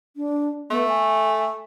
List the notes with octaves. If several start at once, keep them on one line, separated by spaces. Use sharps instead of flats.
D4
A3 B3
G#5